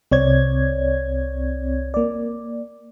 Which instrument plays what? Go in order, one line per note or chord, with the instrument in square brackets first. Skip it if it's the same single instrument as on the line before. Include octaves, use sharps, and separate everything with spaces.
[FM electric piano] C2 C4 C#5 D5 G#6
A#3 D5